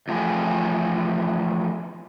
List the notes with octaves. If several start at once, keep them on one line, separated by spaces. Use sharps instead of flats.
E2 F3 A3 G4 G#4